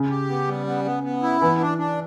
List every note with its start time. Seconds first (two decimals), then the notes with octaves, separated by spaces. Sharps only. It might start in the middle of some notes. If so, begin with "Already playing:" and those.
Already playing: C#3
0.10 G4
0.29 B3
0.48 G3
0.67 B3
0.84 B3
1.03 B3
1.22 E4
1.41 E3 B3
1.60 D4
1.78 D4